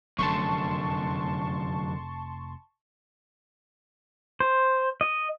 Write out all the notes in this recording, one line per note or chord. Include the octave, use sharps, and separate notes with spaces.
F1 F#2 D3 A3 A5 C6 C#6
C5
D#5